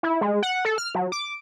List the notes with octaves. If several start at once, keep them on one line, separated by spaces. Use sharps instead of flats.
E4
G#3
F#5
A4
F6
F#3
D6